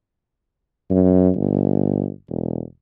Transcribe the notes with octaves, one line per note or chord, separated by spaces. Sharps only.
F#2
G1
E1